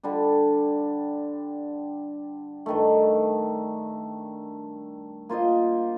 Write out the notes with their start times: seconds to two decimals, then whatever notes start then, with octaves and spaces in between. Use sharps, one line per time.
0.03 D3 G3 D4
2.66 G2 D#3 A3
5.29 A#3 F4 C5 D#5